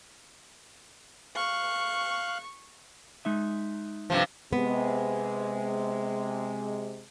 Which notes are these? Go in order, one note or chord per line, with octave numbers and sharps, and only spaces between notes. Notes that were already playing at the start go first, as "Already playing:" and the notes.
F5 C#6 F#6
G#3 D#4 E5
G2 C3 F3
C3 G#3 B3